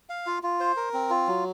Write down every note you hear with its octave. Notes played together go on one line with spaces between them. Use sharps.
F5
F4
F4
C5
A#4
C4
F4
F#3